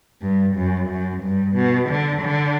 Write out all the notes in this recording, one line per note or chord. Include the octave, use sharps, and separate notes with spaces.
G2
F#2
F#2
G2
B2
D3
D3